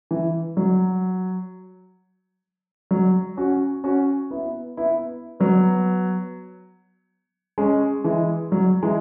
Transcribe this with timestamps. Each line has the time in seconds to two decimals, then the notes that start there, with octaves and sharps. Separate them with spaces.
0.11 E3
0.57 F#3
2.91 F#3
3.37 C#4 F#4
3.84 C#4 F#4
4.31 B3 E4
4.77 B3 E4
5.40 F#3 B3
7.58 G#3 C#4
8.04 E3 G#3
8.52 F#3
8.83 E3 G#3